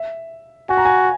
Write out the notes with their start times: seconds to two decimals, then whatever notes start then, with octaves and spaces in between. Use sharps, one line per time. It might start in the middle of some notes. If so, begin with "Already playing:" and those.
Already playing: E5
0.69 F#4 G#5
0.77 A#5
0.85 G#5